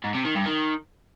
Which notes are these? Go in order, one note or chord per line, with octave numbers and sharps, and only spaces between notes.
G#2
C3
D#3
G2
D#3